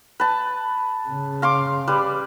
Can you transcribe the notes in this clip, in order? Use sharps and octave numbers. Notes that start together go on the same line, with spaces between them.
B4 A5
C#3
F5 C6 D6
G3 B4